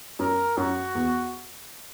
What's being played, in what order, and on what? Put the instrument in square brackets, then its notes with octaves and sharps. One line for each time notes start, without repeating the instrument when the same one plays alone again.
[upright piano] F#2 [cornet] A#4
[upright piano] F#2 [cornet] F#4
[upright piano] E2